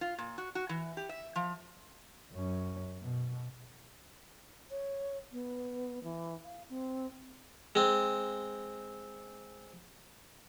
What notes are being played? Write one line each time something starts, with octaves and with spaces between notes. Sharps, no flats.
F4
A#2
F#4
F#4
E3
G4
E5
F3
F#2 C#4
B2
C#5
B3
E3
F5
C4
G#3 C4